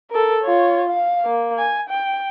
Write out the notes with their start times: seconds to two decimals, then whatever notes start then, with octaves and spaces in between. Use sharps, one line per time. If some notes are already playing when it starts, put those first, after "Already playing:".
0.11 A4 A#4
0.44 F4 C#5
0.90 F5
1.25 A#3
1.58 G#5
1.90 G5